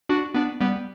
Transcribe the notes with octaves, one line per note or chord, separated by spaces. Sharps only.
D4 F#4
B3 D4
G3 B3